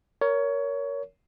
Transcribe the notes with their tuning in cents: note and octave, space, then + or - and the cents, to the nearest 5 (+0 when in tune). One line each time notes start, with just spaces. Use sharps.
A#4 +0 C#5 +20